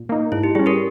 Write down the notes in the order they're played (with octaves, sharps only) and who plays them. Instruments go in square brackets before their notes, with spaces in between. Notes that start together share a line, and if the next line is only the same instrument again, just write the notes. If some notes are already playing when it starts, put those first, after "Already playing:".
Already playing: [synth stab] A#2
A#3 D#4
[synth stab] G#2 [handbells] E4
[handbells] G4
[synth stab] G3 C#4 [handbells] G#4
[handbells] G4 A#4